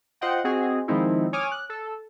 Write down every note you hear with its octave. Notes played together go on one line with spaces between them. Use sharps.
F4 C5 D#5 F#5 G5
C4 F#4 G#4 D#5
D#3 F3 G#3 C4 D#4 E4
C#5 G#5 D6 D#6 F6
F#6
A4